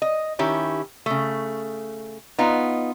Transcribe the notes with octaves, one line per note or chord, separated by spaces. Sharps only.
D#5
D#3 C#4 E4 G4
C#3 A3
B3 D#4 F4